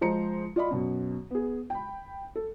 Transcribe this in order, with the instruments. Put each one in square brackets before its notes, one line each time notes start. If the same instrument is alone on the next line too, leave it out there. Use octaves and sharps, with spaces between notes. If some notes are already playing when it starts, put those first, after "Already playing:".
[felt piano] F3 G#3 C5 A#5 C#7
F4 D5 D#5 B5
F#2 B2
B3 G#4
G5 B5
A4